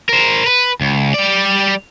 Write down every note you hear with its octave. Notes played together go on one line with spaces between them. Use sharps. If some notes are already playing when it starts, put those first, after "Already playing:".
A#4 C5
B4
C#2
G3 D5